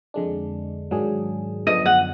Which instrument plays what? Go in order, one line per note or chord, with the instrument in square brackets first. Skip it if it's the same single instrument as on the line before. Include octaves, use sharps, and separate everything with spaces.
[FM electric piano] F2 D3 G#3 D4
G#2 D#3 F#3 D4 G#4
[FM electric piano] F#2 D3 F3 B3 D4 [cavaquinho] D#5
[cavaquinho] F#5